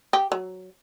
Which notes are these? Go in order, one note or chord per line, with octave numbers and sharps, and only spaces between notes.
G4
F#3